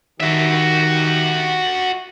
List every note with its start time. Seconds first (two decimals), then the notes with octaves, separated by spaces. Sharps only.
0.21 D#3 F#4 G4 E5